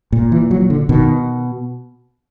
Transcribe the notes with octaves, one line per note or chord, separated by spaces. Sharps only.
A#2
E3
F#3
D3
B2 D#3